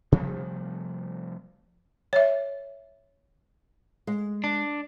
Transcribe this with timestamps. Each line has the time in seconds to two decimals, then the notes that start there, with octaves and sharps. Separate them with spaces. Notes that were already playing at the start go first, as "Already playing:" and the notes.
0.12 C3 F3 G3 A3
2.13 C#5 E5
4.07 G#3
4.44 D4